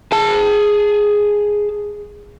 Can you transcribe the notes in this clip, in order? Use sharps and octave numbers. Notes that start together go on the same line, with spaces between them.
G#4 A5